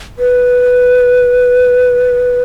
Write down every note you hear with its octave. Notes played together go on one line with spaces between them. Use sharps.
B4